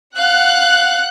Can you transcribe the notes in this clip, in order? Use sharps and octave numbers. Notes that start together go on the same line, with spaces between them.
F5 F#5 F#6